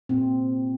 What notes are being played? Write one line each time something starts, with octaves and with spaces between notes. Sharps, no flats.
A#2 C4